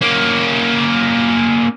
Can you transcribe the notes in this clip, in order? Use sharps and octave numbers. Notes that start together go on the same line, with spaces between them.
A#3 C#4